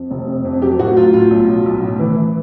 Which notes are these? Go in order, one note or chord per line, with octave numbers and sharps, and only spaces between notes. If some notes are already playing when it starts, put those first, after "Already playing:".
Already playing: F2
F1
C3
F2
F#3 G4
A2 F#4
F#3 F4
A2 F4
B1
F#3
B1
A2
E3
E3